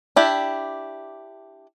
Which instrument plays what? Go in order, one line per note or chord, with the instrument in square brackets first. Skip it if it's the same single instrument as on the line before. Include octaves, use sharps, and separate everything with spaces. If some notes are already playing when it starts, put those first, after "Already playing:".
[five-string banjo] D4 E4 G4